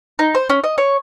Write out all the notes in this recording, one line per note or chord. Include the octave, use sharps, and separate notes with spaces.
D#4
C5
C#4
D#5
C#5